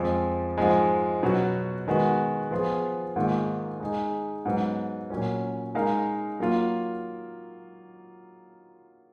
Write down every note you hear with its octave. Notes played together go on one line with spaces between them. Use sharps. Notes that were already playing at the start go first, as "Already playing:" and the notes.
Already playing: F2 F3 G#3
G#2 F3 G#3
B2 F#3 B3 F#4
D#3 G#3 B3 F#4
F3 B3 F4 G#4
G#2 D#3 A#3 F4 G#4
G#3 D#4 G#4
G#2 F#3 B3
A#2 F#3 C#4
G#3 D#4 A#4 F5
F#3 A#3 F4